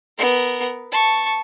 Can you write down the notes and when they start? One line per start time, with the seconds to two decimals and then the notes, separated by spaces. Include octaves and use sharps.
0.19 B3 A#4
0.92 A5 C#6